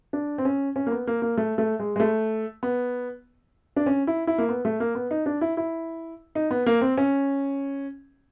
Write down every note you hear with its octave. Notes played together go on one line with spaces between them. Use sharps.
D4
C4
C#4
C#4
A#3
B3
A#3
A#3
A3
A3
G#3
G#3
A3
B3
D4
C#4
E4
E4
A#3
B3
A3
A#3
B3
D#4
D4
E4
E4
D#4
B3
A#3
C4
C#4